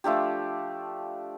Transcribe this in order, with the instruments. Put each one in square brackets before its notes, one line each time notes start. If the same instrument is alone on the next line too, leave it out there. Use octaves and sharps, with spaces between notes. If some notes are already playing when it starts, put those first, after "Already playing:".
[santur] F3 A3 D4 G4